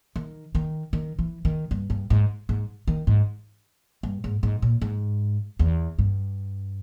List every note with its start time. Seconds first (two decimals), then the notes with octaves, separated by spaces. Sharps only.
0.16 D#3
0.55 D#3
0.93 D#3
1.19 E3
1.45 D#3
1.71 G2
1.90 G2
2.10 G#2
2.49 G#2
2.88 D#3
3.07 G#2
4.03 G2
4.24 G#2
4.43 G#2
4.62 A#2
4.82 G#2
5.59 E2
5.99 G2